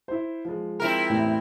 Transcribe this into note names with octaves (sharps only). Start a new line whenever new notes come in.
E4 C5
F3 G#3
C4 E4 A#4
A1 E2 A2